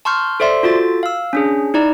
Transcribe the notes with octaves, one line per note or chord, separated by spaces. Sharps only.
A5 C6 C#6 F6 G6
A4 C5 D5 E5 C6
F4 F#4 A4 A6
F5 E6
C#4 D4 G#4
D#4 E4 D5 A#5